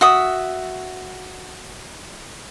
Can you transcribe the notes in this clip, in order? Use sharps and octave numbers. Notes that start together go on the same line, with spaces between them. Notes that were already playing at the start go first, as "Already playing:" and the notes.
F#4 E5 D#6